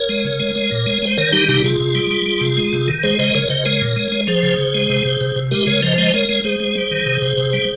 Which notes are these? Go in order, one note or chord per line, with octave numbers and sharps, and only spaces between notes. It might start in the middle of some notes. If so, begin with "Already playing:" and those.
Already playing: A#4 C#5
G#3
C#3
G#3
G#3
A#2
G#3
G#3 C5
D#3 A#4 C#5
G3 D#4 G4
C3 D#4 G4
C3 F4 G#4
C3
G3
G3
G3
C3
G#3
C3
D#3
G#3 G#4 C5
C#3 C5 D#5
C#3 A#4 C#5
C#3 C5 D#5
G#3 A#4 C#5
A#2
G#3
G#3
F3 G#4 C5
C#3
C#3
G#3
C3
C3
C3
C3
G#3 G4 A#4
C#3 A#4 C#5
F3 C5 D#5
G#3 C5 D#5
G#3 A#4 C#5
G#3
G#3 G#4 C5
G#3
G3
D#3
C3
C3
C3
G3